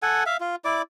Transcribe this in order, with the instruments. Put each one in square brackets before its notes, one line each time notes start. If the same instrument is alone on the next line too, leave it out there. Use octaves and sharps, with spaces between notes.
[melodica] A4 F#5 G#5
E5 F5
F4
E4 D5 D6